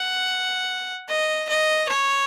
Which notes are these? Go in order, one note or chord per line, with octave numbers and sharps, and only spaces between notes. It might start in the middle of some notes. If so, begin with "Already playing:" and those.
Already playing: F#5
D#5
D#5
C#5